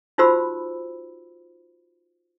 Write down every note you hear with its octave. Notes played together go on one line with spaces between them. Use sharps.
D#4 F4 F#4 C5 B5 E6